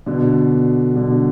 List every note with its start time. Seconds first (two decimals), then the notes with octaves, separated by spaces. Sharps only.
0.06 B2 D3
0.95 B2 D3